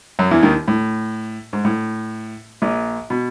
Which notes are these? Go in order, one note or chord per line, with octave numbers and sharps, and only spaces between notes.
F#2 F#3
E2 E3
D#2 D#3
A2
G#2
A2
A#1 A#2
B2